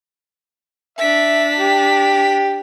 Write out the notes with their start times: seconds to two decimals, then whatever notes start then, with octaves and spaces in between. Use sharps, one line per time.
0.99 D4 E5 B6
1.57 G4